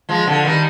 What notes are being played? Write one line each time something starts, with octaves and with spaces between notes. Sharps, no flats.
F3 G#3
D3 F3
D#3 G3